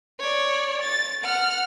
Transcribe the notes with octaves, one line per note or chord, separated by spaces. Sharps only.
C#5 D5
A6
F#5 F6